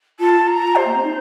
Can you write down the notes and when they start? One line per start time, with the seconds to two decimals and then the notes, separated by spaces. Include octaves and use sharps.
0.20 F4 A5
0.47 A#5
0.76 G4 C5
0.85 A#3
0.94 C4
1.03 D#4